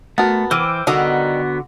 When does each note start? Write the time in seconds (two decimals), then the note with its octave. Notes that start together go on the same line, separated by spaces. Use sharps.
0.18 A3 B3 F#4 A#4 A5 A6
0.51 E3 C5 G5 D6 E6 F6 D#7
0.87 D3 D#3 G3 B3 F#4 D#5 A#5